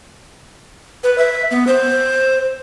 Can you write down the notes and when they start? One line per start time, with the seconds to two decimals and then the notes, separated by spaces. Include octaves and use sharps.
1.04 B4
1.18 E5
1.51 B3
1.67 C5